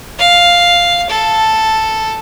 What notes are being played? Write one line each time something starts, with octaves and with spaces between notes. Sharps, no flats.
F5
A4